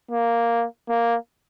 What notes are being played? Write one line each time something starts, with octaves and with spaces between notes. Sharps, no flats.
A#3
A#3